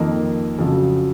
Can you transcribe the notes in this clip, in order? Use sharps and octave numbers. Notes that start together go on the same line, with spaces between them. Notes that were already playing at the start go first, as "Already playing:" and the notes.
Already playing: F2 D#3 A#3 D#4
F2 C#3 F#3